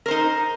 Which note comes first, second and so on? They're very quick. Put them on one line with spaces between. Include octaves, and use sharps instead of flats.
A#4 C5 D#4